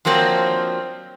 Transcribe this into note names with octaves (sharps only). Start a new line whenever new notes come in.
F3 F#3 A#3 C4 D4